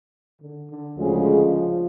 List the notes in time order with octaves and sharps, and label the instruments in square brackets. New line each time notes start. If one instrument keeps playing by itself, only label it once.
[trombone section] D3
D3
[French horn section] D2 C#3 G#3 [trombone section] F3